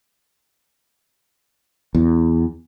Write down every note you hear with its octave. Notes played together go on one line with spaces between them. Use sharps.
E2